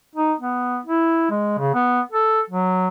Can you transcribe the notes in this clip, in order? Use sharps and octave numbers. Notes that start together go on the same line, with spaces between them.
D#4
B3
E4
G#3
C#3
B3
A4
F#3